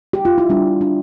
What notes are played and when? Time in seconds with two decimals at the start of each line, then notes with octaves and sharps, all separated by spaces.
0.13 G4
0.25 F4
0.38 E4
0.49 G3 D4
0.81 D4